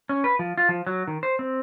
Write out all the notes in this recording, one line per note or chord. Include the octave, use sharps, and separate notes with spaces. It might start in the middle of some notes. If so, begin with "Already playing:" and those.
C#4
B4
F3
F4
F3
F#3
D#3
C5
C4